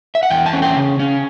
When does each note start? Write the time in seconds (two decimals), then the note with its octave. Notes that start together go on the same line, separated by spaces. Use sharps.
0.15 E5
0.23 F#5
0.30 E2 G5
0.46 A5
0.53 C#4
0.62 G5
0.76 C#3
0.99 C#4